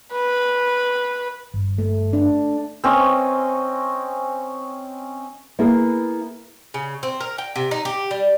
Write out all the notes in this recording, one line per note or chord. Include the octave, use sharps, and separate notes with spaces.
B4
G1
A3
D4
C4 C#4 D#5
A#3 B3 E4 G#4 A#4
C#3
C4
A#4
G5
C3
D#4
G4
G3